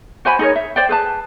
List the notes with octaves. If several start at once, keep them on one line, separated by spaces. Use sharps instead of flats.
F#4 C5 G#5 B5
D#4 G#4 A#4 C#5
E5
C5 D5 G5
G#4 B4 A5